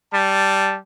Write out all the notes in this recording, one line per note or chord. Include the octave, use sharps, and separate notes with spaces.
G3 A5